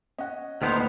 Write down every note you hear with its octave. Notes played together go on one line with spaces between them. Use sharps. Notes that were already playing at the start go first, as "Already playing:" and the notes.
C#4 D#5 F#5
D2 A2 D#3 A#3 B3 D#4 C5 F6